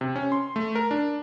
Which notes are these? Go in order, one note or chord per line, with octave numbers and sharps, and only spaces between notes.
C3
C#4
C6
A3
A#4
D4